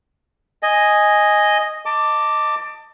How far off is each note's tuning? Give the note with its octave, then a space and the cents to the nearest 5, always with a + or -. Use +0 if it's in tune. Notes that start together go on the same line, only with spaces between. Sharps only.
D#5 +0 G#5 +0
D#5 +0 A5 +25 D6 +0